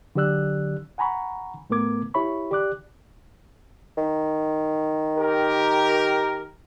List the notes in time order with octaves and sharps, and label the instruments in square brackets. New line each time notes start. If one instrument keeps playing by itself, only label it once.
[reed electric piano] D3 F#3 G4 D5 E6 F#6
F#5 G#5 A#5 B5 C#6
A2 A3 B3 A#4 D6 G#6
E4 G4 C#5 E5 B5 C#6
G4 D5 D6 F#6
[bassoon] D#3
[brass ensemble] G4 A#4